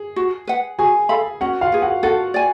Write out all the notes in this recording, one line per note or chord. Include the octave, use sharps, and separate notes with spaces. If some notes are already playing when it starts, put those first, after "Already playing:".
Already playing: G#4
F#4
B4 F#5
F#4 G#4 G#5
A4 F5 B5
C#4 F#4 F#5
F4 F5
G#4 B4
F#4 F#5
F#4 A4 F#5
D5 G#5